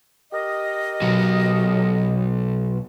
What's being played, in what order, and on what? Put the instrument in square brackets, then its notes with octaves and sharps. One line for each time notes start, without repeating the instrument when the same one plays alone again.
[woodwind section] G4 A#4 D#5
[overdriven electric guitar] B1 F#3